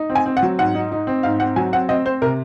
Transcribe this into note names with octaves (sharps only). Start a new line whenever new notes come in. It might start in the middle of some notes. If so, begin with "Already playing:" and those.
Already playing: D#4
C4
G#5
C4
F#5
F#3
G#2 F#5
D#4
D#4
C4
G#2 F5
C4 F#5
F#3 G#5
C4 F#5
C4 D#5
C4 C5
C3 A#4